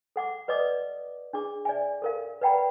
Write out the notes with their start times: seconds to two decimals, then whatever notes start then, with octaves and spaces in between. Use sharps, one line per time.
0.16 A4 F#5 D6
0.48 B4 D5 D#5 D6 D#6
1.33 D4 G#4 D6
1.65 D5 E5 G#5
2.02 A4 A#4 F5
2.41 B4 D5 F#5 G5 A#5 B5